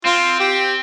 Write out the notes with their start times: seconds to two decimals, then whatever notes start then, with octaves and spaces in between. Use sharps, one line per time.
0.05 C4 F4
0.40 G4